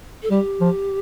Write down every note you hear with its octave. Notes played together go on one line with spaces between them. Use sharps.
A4
G3 G4
F3